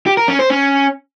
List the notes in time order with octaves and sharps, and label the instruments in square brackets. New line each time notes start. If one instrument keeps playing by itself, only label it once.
[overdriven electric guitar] G4
A#4
C#4
C5
C#4